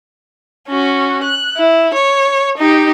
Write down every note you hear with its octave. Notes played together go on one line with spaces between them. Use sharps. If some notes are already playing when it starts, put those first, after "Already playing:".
C#4 F#4
F#6
E4
C#5
D#4 G4